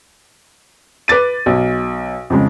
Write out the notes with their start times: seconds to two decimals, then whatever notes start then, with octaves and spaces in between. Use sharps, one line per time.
1.08 B4 D6 A6 D#7
1.46 B1
2.30 F2 C#3 G#3